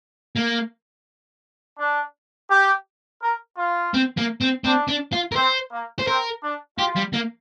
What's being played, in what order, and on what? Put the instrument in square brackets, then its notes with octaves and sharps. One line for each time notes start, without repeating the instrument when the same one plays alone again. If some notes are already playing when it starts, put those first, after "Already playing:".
[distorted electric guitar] A#3
[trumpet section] D4
G4
A#4
F4
[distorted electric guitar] C4
A#3
C4
[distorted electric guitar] C4 [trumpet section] D4
[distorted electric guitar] D4
F4
A#4
[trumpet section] C4 [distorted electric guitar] C5
[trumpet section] A#3
[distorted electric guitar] C5
[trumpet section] C4 [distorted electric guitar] A#4
[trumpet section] D4
[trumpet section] F4 [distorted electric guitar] G4
[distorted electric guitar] G3
A#3